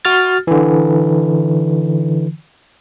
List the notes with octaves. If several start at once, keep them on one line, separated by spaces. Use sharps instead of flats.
F#4 F6 A6
D3 E3